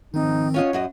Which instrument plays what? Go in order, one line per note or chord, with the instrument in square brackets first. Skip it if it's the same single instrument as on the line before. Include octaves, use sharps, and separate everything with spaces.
[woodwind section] G#2 F3 D#4 [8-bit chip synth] D#3 C4
[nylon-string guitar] C#4 F4 D#5 [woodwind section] C#5 F#5
[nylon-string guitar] F#2 F#4 D#5